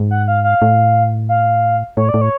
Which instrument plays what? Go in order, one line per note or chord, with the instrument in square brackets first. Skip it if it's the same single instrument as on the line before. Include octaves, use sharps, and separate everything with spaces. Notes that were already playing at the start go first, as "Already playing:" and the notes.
Already playing: [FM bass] G#2
[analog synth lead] F#5
F5
F5
[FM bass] A2
[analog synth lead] F5
[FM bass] A2 [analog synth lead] C#5
[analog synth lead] D5
[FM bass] A2
[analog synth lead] C#5